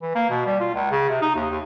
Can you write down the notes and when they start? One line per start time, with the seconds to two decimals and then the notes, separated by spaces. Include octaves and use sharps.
0.02 E3
0.15 A#3
0.30 B2
0.46 G3
0.60 F4
0.74 C#2
0.91 C#3
1.09 C3
1.21 D#4
1.35 D#2
1.50 D#2